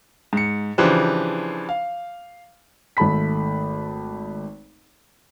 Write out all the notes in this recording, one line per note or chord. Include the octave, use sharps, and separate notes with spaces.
G#2 C#7
C#3 E3 F3 D4 G4 C5
F5
G#1 A3 A5 B5 B6